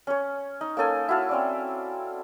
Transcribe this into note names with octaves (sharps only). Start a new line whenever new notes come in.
C#4 C#5
D#4
A#3 C#4 A4 G#5
E4 F#4 F5 A5
C4 C#4 D5